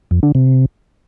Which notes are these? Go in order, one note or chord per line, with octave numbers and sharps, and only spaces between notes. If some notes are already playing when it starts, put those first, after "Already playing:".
F2
D3
C3